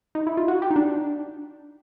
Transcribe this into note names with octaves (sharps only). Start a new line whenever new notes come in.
D#4
E4
F4
F#4
G4
D#4
D4